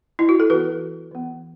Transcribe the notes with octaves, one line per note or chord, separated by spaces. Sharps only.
E4
F#4
A4
E3 B3 F#4 B4
E3 B3